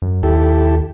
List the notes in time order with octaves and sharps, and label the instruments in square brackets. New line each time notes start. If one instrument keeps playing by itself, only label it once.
[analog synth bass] F#2
[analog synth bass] D#2 [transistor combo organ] E4 G4 A4